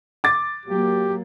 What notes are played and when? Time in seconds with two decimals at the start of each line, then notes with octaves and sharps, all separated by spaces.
0.24 D6 A6
0.66 F#3 A#3 G4